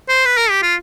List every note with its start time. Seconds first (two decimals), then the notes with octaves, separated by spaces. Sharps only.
0.09 C5
0.25 B4
0.37 A#4
0.50 G4
0.62 F4